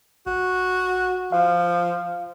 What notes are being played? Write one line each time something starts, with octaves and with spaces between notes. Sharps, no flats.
A1 F#4
F3 F5